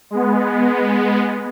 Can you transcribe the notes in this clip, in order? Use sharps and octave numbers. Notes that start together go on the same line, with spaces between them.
G#3 B3